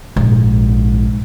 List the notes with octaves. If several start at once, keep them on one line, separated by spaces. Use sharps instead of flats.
A#1 G#2